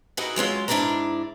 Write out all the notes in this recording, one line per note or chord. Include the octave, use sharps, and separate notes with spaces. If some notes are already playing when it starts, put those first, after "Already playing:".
D#4 E4 F#4 G#4 A#4 B4
F#3 G#3 C#4 F4
G#2 D4 E4 C5 D5 A#5